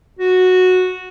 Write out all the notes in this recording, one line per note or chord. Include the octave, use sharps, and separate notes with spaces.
F#4